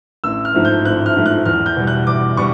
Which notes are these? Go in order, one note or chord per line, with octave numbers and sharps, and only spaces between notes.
A1 E6
F6
G#2 F3 A3
G6
A1 F#6
F6
G#2 F3 A3
F#6
E2 F6
G6
B2 G3
F#6
E2 D6
B2 G3 C#6